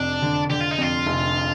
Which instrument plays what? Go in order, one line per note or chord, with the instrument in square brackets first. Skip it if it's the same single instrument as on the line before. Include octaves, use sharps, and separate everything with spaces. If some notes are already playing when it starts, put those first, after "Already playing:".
Already playing: [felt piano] F1 F2 [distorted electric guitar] D4
[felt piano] D3
[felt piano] D3 [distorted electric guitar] G4
[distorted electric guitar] F4
D#4
[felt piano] F2 [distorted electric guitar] F4
[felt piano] F1